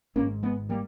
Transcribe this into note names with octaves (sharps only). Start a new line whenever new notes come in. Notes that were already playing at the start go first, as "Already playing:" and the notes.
G#1 G#2 A#3 C#4
G#3 B3
G3 A#3